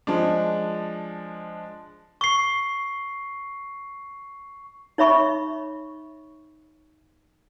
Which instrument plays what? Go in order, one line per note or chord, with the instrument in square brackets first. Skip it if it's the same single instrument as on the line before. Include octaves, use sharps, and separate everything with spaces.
[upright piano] F3 G#3 D4
[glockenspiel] C#6 C7
[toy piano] D#4 C#5 E5 B5 C#6